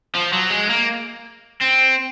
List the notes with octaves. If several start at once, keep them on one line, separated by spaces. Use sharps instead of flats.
F3
F#3
G#3
A#3
C4